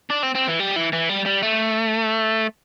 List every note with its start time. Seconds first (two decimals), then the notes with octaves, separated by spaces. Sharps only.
0.10 D4
0.23 C4
0.35 C4
0.47 E3
0.60 G3
0.76 E3
0.92 E3
1.09 G3
1.25 G3
1.42 A3